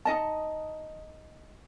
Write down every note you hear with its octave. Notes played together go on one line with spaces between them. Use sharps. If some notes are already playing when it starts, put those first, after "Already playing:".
D#4 D#5 A5